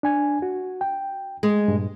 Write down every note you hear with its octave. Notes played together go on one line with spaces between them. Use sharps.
D4 G#5 G#6
F#4
G5
G#3
G2 A#2